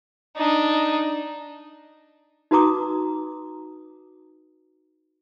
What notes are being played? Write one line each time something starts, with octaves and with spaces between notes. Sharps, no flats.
D4 D#4
D#4 F#4 B4 A#5 D6 D#6